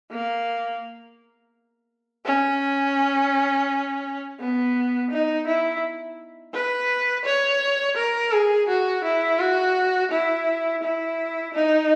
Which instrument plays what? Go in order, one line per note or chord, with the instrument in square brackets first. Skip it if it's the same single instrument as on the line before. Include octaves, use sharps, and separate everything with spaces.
[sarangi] A#3
C#4
B3
D#4
E4
B4
C#5
A#4
G#4
F#4
E4
F#4
E4
E4
D#4